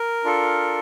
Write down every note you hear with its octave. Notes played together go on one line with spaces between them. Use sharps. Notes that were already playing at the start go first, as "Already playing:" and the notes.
Already playing: A#4
D4 F4 A4